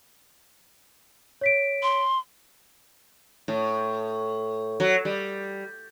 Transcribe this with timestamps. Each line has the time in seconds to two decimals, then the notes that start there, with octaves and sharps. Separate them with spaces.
1.41 C#5 B6 D7
1.83 C6
3.48 A2
4.80 F#3
5.05 G3